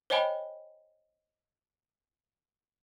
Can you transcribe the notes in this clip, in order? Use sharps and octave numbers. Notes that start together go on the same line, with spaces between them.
C5 C#5 D#5 G5 G#5 B5